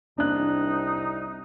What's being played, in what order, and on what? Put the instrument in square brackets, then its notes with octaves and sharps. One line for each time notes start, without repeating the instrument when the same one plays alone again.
[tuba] C2 [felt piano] D4 F#6 [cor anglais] D#4